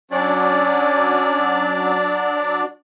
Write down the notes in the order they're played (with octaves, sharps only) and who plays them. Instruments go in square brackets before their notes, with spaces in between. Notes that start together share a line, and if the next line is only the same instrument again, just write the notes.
[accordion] F#3 D4 D5 [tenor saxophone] C#4